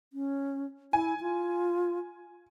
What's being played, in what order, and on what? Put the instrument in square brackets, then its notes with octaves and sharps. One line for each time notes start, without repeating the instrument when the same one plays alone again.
[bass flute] C#4
[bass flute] E4 [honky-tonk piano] G#5
[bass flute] F4